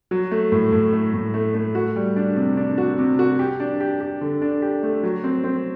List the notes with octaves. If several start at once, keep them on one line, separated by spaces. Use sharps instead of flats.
F#3
A3
A2
A2
A3
A2
A3
A3
F#4
G3
D4
C3
D4
F#4
C3
F#4
G4
D4
G4
G4
D3
D4
G4
A3
F#3
C4
C4